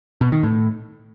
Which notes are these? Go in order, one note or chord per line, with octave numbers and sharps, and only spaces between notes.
B2
D#3
A2